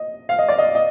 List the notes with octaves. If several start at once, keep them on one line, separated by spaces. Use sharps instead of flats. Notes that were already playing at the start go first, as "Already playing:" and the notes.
Already playing: D#5
F5
D#5
D5
D#5
D#5